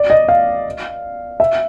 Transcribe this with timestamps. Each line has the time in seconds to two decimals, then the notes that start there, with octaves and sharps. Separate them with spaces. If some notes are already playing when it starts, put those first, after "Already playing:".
Already playing: D5
0.10 D#5
0.29 F5
1.40 E5